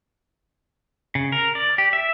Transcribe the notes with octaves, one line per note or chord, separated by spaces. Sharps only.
C#3
A#4
D5
G4
E5